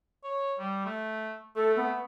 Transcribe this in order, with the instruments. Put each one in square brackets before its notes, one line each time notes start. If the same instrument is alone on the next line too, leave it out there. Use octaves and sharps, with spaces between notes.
[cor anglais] C#5
G3
A3
[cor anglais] A3 [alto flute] A4
[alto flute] B3